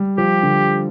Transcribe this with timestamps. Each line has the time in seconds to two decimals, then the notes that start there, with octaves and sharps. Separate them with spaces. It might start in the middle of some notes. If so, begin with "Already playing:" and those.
Already playing: G3
0.18 F3 G4
0.43 D3